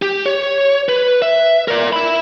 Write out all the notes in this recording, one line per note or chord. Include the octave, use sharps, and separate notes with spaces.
G4
C#5
B4
E5
A#4 D5
E5 B5